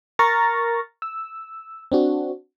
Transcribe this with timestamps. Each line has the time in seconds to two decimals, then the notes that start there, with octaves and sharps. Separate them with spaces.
0.19 A#4 A#5 C#6 F6 A6 A#6
1.02 E6
1.92 C4 D4 F#4